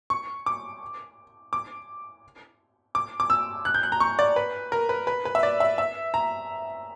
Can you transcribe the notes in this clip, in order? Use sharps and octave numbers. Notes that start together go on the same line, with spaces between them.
C#6
D6
D6
D6
D6
E6
F#6
G6
F#6
A#5
C#6
D5
B4
A#4
B4
B4
B4
E5
D5
E5
E5
A#5